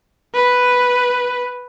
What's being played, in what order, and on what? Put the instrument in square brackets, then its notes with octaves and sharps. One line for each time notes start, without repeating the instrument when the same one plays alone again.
[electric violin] B4